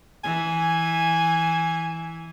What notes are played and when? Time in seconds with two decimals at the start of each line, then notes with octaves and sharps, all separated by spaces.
0.24 E3 G#5